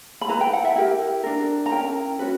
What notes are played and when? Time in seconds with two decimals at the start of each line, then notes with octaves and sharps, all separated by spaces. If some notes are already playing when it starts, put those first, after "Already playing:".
0.21 B5
0.28 E4 B4 A#5
0.41 G5
0.53 F#5
0.65 E5
0.76 E4 G4 A#4 G5
1.24 D4 A#4
1.66 A#5
1.71 C#4 E4 A#4 G5
2.19 C#4 F#4 B4